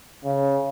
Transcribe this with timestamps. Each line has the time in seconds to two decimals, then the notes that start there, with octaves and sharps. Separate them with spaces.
0.24 C#3